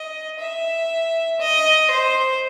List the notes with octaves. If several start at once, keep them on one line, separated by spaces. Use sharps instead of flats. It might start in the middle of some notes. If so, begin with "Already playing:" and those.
Already playing: D#5
E5
D#5
C5